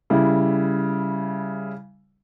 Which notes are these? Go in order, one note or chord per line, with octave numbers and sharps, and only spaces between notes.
C#3 G3 E4